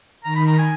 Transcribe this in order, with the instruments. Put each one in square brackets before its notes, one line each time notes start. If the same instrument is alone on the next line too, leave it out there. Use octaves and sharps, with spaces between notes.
[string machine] D#3 [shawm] A#5
[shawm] B5
A#5
G#5